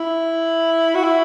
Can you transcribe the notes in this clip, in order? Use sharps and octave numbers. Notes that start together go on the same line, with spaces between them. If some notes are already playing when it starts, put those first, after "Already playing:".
Already playing: E4
F#4
E4